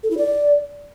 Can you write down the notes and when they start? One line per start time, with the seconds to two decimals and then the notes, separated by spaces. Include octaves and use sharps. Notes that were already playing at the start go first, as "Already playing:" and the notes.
0.03 A4
0.11 E4
0.18 D5